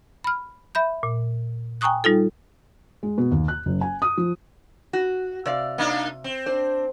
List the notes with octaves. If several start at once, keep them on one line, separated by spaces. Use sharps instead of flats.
B5 F6
E5 B5 G6
A#2
G5 G#5 A#5 C#6 D#6 F#6
G3 D#4 F4 A4
G#3
B2
D#2
F#6
F#1
G#5
D#6
F3
F#4
C3 D5 F5
A#3 D4 D#4
C4
D4 C5